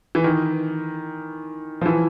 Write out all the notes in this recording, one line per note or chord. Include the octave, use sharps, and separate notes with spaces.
E3
D#3
F3
E3